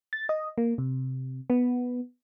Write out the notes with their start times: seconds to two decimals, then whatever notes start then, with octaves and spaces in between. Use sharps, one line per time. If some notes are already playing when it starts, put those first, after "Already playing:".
0.13 A6
0.29 D#5
0.58 A#3
0.78 C3
1.50 B3